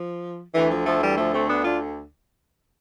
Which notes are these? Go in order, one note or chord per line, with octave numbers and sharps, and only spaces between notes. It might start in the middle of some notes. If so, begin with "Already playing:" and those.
Already playing: F3
D2 D3 E3
F3
F3 A3
E3 G3
F3 A3
A3 C4
B3 D4
D4 F4